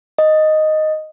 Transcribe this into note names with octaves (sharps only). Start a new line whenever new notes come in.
D#5